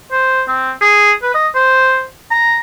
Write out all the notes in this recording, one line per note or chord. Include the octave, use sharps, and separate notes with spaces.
C5
C4
G#4
B4
D#5
C5
A#5